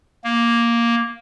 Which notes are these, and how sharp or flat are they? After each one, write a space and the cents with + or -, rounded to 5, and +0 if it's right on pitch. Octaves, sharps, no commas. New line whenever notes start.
A#3 +5